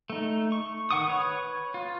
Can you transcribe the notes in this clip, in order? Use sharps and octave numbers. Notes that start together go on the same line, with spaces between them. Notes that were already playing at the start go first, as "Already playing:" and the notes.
A3 D#4
C#6
D#3 F#5 C#6 D#6
B4 C#5
F4